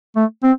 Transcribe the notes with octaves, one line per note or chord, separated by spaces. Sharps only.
A3
C4